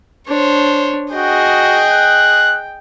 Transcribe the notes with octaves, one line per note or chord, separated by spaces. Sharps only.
D4 C5 C#5
F#4 G#4 D#5 G5
F#6